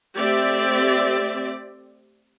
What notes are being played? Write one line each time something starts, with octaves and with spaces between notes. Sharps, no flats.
A3 C4 G4 D5 E5